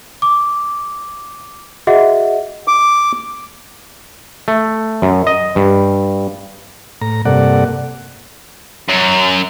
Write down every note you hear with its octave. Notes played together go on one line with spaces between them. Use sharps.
D6
F#4 G#4 D#5 E5 F#5
D6
A3
F#2
D#5
G2
A2 A#5
G2 C3 A#3 A4 D5 F#5
F#2